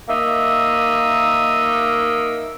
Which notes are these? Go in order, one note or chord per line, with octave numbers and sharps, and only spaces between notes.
A#3 D#4 E5